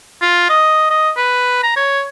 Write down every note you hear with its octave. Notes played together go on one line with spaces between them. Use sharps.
F4
D#5
D#5
B4
A#5
C#5